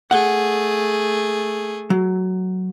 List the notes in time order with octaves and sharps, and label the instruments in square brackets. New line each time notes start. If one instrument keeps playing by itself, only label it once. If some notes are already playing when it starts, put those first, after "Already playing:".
[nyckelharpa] A3 G#4 [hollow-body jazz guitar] F#5
[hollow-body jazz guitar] F#3